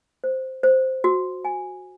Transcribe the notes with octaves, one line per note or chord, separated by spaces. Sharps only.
C5
C5
F#4
G#5